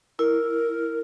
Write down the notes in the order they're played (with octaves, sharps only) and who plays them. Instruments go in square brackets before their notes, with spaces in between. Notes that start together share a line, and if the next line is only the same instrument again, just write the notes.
[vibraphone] E4 [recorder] A#4